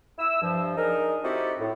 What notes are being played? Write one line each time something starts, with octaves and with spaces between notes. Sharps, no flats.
E4 E6
G2 F3
D4 D#4 G#4 A#4
C4 D#4 E4 F#4 G4 A4
A2